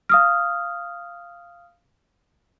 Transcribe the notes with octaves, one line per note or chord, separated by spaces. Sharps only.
F5 D#6 F6